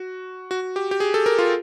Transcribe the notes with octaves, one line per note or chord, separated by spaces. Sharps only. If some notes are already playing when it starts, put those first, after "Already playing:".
Already playing: F#4
F#4
G4
G4
G#4
A4
A#4
F4